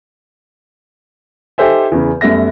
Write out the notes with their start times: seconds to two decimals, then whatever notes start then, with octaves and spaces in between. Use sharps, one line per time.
1.58 D#4 G4 A4 C5 E5 G#5
1.92 E2 C#3
2.21 F#2 G3 A3 B3 E5 A#6